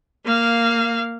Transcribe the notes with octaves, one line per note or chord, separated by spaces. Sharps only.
A#3 F5